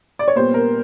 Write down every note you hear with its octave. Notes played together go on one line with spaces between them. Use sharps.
D5
C#5
A#2 G3 B3 C5
A#4